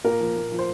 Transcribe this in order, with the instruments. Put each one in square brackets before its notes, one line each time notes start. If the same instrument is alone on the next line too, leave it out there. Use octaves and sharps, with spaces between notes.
[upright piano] A#2 A#3 A#4
F3
A#2
F3
C5